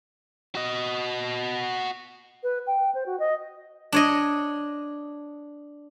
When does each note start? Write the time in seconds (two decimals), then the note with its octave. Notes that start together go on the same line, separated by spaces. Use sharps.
0.55 F#4 D#5
2.43 B4
2.67 G5
2.95 C5
3.06 F#4
3.20 D#5
3.92 D4 C#5 D#5